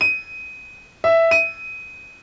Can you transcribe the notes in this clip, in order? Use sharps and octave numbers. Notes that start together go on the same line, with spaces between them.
D#7
E5
D#7